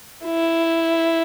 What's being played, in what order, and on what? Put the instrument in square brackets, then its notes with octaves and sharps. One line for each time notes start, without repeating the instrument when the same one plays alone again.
[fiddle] E4